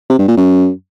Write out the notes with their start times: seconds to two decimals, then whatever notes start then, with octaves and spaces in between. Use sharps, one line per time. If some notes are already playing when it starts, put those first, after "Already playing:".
0.10 C3
0.19 G2
0.28 A#2
0.37 F#2